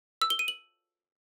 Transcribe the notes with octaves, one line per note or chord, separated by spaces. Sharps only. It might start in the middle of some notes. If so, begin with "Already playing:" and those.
E6
G7
D#7
F#7